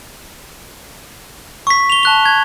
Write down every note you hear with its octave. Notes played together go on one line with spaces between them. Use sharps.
C#6 B6
F7 G7
A5 F#6 G7
G#6